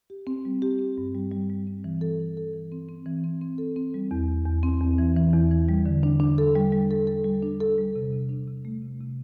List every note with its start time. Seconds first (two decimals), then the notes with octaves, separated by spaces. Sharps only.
0.10 G4
0.27 C4
0.45 G3
0.62 G4
0.79 C4
0.98 G2
1.15 G3
1.32 G3
1.50 G3
1.67 C4
1.84 E3
2.01 A4
2.20 E3
2.37 A4
2.54 E3
2.72 C4
2.89 C4
3.06 E3
3.24 C4
3.42 C4
3.58 A4
3.76 C4
3.94 G3
4.11 E2
4.28 E2
4.45 E2
4.63 C4
4.81 E2
4.98 E3
5.16 E3
5.33 E2
5.51 E3
5.69 G3
5.86 D3
6.03 D4
6.20 D4
6.38 A4
6.55 G3
6.72 G3
6.91 A4
7.07 A4
7.25 G3
7.43 D4
7.61 A4
7.78 G3
7.96 C3
8.12 C3
8.29 D4
8.48 C3
8.65 A3
8.82 C3
9.00 C3